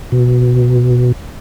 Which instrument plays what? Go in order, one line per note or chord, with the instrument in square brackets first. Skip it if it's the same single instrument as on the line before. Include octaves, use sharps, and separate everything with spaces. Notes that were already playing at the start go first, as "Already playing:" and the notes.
[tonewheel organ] B2